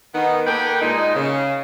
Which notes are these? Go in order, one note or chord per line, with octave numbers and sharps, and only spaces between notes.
D#3 B3
A#3 A4 B4 G5
A#2 G#3 D#4
C#3